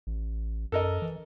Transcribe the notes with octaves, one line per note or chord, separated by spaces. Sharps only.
A1
F#2 A4 A#4 D#5
E3